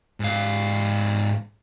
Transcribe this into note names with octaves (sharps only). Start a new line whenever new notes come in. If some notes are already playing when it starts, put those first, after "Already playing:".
G#2 F5